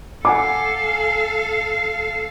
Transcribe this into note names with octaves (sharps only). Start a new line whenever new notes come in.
A4 F5 F#5 G#5 D6